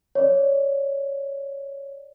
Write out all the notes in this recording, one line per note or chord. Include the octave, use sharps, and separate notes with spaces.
C#5 D5